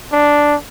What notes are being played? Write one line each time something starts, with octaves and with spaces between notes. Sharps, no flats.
D4